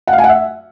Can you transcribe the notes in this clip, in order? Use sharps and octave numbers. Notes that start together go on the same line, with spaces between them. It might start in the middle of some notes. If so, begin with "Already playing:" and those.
F#5
F5
G#5
F#5
E5